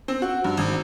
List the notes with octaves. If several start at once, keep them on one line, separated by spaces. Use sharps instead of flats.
C4
F#4
G2
G#1